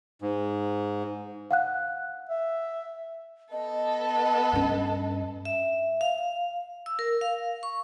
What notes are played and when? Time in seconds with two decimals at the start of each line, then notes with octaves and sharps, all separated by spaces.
0.22 G#2
1.51 F5 F#5 F#6
2.29 E5
3.52 B3 A4 D#5
4.53 G2 C#4
5.45 E5
6.01 F5
6.86 E6
6.99 A#4
7.21 F5
7.63 C#6